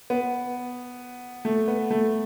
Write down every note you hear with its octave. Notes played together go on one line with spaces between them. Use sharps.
B3
A3
B3
A3